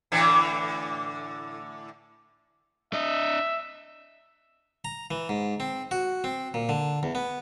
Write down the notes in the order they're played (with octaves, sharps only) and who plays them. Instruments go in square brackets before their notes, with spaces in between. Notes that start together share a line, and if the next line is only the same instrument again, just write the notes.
[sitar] A2 D3 E3
[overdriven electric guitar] D4 D#5 [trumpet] E5
[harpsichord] A#5
E3
G#2
C4
F#4
C4
A#2
D3
E2
B3